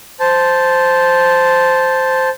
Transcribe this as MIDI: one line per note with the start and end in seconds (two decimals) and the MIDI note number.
0.20 2.29 72
0.20 2.29 81